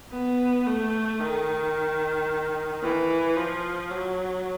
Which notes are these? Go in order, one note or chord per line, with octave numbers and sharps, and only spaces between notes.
B3
A3
D#3
E3
F3
F#3